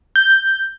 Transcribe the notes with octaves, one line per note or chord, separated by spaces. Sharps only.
G6